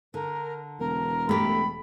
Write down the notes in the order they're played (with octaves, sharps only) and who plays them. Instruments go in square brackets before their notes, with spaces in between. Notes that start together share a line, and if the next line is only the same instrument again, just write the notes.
[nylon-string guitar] D3 [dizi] A#4
[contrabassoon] E1 [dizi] A#4
[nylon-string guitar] A3 G4 [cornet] B5